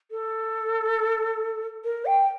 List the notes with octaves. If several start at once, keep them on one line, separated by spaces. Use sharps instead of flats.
A4
A#4
G5